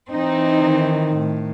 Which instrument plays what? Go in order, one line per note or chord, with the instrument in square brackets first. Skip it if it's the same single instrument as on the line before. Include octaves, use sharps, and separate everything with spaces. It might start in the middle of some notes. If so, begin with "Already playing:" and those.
[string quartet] E3 C4 [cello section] D#4
[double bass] D#3
[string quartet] A2